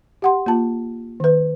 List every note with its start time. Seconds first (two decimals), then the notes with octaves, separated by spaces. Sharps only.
0.22 G4 F#5 C6
0.46 A#3 F4 A5
1.20 D#3 B4